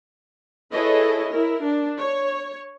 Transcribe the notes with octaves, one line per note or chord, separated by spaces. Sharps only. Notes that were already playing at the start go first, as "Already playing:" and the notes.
E4 G#4 A4 B4 C#5 D#5
E4 A#4
D4
C#5